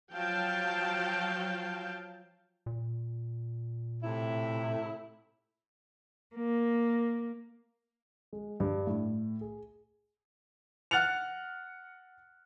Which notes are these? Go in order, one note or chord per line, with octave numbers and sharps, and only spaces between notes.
F3 F#3 F5 G5 A5
A#2
A2 C3 E4
A#3
G#3
G2
A2
G#4
F#5 F6 F#6 A6 C#7 F7